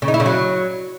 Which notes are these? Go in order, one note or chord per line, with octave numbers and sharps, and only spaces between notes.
C#3
D#4
E4
C#3
F#3